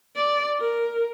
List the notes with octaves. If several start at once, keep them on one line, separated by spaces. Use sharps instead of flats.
D5
A#4